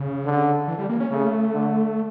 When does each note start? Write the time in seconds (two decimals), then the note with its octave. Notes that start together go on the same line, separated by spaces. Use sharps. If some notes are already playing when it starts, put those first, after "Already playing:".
Already playing: C#3
0.26 D3
0.68 E3
0.79 G3
0.89 A#3
1.00 C#4
1.11 C#3 A3
1.54 D3